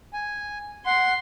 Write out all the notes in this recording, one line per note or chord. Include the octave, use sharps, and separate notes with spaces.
G#5
F#5 C6